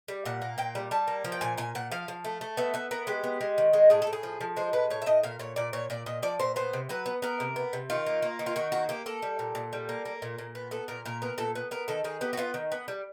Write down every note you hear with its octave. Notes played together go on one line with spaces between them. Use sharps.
G3
A#2 F#5
A#3
A#2 G5
G3
G3 A5
A#3
F3
G5
A#2 G#5
A#2 G#5
A#2 F#5
F3 F5
F3
A3
A3
B3 E5
B3 E5
B3 A#4
G#3 G4
B3
G#3
D#3
G#3
A2 G#4
A4
A2
G#4
F3
F3
G#3 C5
A2 B4
A2 C#5
E5
A2 D#5
A#2 F5
A#2 C#5
A#2 D5
A#2 C#5
A#2 D5
A#2 D#5
F3 D5
A#2 C5
B3 C5
C3
F#3 B4
B3
B3 A#4
C3
B3
C3
D#3 F4
A#3
A#3
D#3
F4
D#3 F#4
A#3 F#4
A#3 G4
A#3 A4
G3
A#2
A#2
G3
A#3
A#3
A#2
A#2
B3
B3 A4
A#2 A#4
A#2 A#4
B3 A#4
A#2 A4
B3
B3 A#4
D#3 A4
D#3 G#4
B3 G4
F#4
B3 F4
D#3
B3
G3